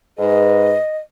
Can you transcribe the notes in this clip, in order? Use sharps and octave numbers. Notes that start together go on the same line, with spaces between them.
G#2 G#4 B4 D#5